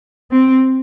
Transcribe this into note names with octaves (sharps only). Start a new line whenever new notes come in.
C4